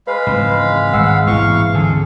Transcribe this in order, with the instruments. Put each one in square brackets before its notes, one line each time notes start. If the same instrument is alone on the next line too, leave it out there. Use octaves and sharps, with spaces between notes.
[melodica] G#3 F5 B5 [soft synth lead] B4
[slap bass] G#2 C#3 E3 [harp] C4
[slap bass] G#1 [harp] G#2 E6 C7 [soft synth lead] F#5
[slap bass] A1 B2 G#3 [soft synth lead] E3 [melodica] F5 C#6 [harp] F6
[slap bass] D2 D3 C4 [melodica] G#4 A4